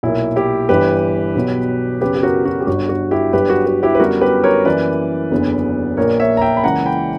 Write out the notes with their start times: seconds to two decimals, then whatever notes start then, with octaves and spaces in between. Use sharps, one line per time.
0.03 B1 A#2 A#3 E4
0.36 E4 G4
0.69 G1 G2 E3 G4 B4
1.35 B1 B2 F#3 B3
2.01 F#2 C#3 F#3 B3 G4 B4
2.15 G4
2.23 F#4 A#4
2.45 F#4
2.60 G4
2.67 G1 G2 D3 F#4
2.89 F#4
3.11 E4 G4
3.33 G1 G2 F#3 G4 B4
3.50 F#4
3.66 F#4
3.83 E4 G4
3.95 B4
3.99 F#2 D3 G3 B3 F#4 A#4
4.21 G4 B4
4.44 A#4 C#5
4.65 F#2 E3 A#3 B4 D5
5.31 F#1 E2 D3 F#3 B3
5.97 A#1 A#2 A#3 A#4 C#5
6.20 C#5 E5
6.37 A#5
6.41 E5 G5
6.57 B5
6.63 C#2 C#3 E3 A#3 F#5 A#5
6.86 G5 B5